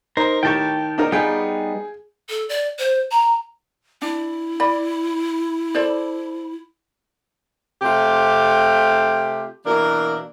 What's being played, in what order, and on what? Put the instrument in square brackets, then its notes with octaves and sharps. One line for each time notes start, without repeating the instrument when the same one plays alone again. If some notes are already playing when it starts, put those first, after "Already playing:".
[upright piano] D#4 [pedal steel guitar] A#4 C5
[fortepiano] A2 G4 [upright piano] D#3 [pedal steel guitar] G5 A5 C#6
[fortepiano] D4 D#4 A#4
[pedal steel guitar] G3 B3 D#4 [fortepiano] F4 G5 [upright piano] G#4
[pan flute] A4
D5
C5
A#5
[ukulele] D4 [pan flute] E4
[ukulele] D5 B5
A4 C5 D5
[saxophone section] C3 A3 F4 G4
B2 E3 A#3 D4 A#4